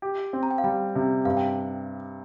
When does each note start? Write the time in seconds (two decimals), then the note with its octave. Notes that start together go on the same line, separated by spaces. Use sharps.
0.02 G4
0.33 C4
0.43 A#5
0.51 G5
0.58 F5
0.64 G3 G5
0.95 C3
1.25 G2 F5
1.37 G5